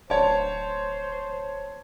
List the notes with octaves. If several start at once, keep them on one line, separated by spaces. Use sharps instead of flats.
D1 C5 C#5 A5